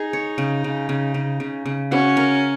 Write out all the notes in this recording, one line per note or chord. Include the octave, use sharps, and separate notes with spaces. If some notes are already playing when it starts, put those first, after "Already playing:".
Already playing: D#4 G#4
C#5
C#3
C#3
C#3
C#3
C#3
C#3
C#4 F#4
A#4